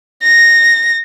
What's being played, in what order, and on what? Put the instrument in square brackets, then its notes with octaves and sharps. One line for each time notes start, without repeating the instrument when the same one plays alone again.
[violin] A#6